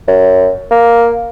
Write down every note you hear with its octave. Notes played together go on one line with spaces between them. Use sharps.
F#2
A#3